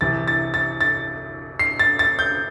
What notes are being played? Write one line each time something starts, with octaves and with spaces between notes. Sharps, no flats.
C2 C3 E3 A6
A6
A6
A6
C7
A6
A6
G6